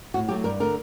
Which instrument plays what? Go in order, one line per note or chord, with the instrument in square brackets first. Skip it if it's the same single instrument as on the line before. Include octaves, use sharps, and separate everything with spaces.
[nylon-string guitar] A2 F#4
F#3 A3 G4
G2 A#4
D3 A3 A#4